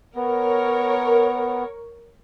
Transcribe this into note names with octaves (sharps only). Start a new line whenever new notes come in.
B3 A#4 C#5